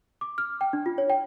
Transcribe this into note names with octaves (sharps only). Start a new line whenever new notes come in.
D6
F6
G5
D4
F4
C#5
G5